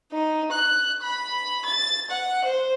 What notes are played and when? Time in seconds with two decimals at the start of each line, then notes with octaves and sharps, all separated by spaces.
0.12 D#4
0.52 F#6
1.02 B5
1.65 A6
2.10 F#5
2.44 C5